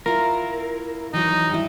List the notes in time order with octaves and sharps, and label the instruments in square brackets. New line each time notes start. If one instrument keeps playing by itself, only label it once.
[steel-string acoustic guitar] E4 F4 [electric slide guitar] A#4
[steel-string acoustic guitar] E3 F#3 [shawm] D#4
[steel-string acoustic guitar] G2 E4